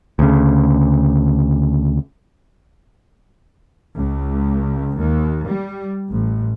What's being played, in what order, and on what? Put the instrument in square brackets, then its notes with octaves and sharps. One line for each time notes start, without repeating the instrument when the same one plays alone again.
[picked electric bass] D2 C#3
[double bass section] C#2
D#2
G3
A1